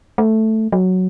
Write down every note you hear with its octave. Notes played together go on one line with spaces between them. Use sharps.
A3
F#3